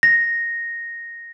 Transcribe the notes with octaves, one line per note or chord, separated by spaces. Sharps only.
A#6